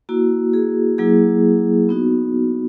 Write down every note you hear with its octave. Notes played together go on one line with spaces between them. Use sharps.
A#3 E4 F#4
G#4
F#3 A#3 E4 G#4
B3 D#4 F#4